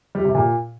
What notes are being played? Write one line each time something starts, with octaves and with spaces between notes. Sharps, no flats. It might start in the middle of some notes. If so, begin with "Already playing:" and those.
G3
C3
A#2